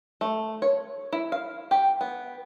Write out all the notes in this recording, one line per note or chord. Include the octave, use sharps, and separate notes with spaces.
A3
C#5
E4
F5
G4
B3